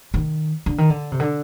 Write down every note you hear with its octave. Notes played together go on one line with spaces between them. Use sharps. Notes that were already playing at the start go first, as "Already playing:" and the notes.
D#3
D3
D#3
D3
C3
D3